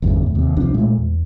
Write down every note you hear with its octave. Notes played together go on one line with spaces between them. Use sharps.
G1 E2 G2 C#3
E2 A2
D#2 C3
C2 C3 F3 D4
A#2 G#3 A3
E2